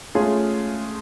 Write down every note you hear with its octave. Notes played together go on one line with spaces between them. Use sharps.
G#3 A3 C#4 F4 G#4